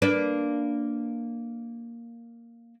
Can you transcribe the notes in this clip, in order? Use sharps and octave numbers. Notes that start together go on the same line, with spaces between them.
A#3 D4 B4